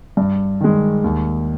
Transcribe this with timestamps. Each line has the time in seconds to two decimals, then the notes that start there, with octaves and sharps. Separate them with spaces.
0.17 G2
0.61 D#3 G#3
1.04 D#2